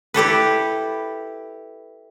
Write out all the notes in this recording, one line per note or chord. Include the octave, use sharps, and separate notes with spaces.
E4 G4 A4 B4